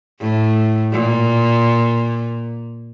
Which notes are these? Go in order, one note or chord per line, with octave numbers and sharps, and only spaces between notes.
A2
A#2